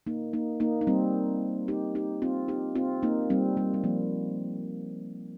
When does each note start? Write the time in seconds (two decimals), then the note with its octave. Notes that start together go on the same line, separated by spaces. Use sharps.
0.07 A#3 D#4
0.33 A#3 D#4
0.60 A#3 D#4
0.81 D#4
0.87 G3 C4
1.68 D#4 G4
1.95 D#4 G4
2.22 C4 F4
2.48 D#4 G4
2.75 C4 F4
3.03 A#3 D#4
3.30 G3 C4
3.57 G3
3.74 G3
3.84 F3 A#3